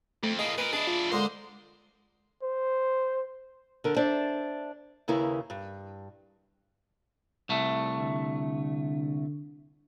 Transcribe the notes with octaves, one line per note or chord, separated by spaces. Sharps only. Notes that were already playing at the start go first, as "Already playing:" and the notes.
F2 A3
A2 A#3 G#4 D#5
A#2 A#4 B4
D4 E4 G#4
F4
D3 G#3 A#3 C5
C5
D3 A#4
D4 C5 D5 E5
D#2 C#3 E4 A#4 B4
G2
C2 A3
D3